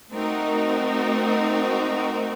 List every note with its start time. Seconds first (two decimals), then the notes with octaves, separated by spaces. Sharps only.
0.13 A3 C4 D#4 F#4 A#4